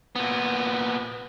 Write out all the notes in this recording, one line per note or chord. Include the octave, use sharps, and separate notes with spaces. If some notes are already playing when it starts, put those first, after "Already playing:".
A#2 B3